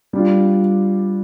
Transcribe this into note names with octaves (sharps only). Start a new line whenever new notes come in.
G3 D4 F4